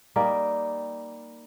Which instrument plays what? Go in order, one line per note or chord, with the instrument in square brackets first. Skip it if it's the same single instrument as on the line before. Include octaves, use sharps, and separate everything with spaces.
[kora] G3 A#3 D#4 D5